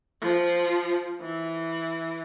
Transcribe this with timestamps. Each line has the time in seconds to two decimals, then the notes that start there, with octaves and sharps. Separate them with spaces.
0.21 F3
1.21 E3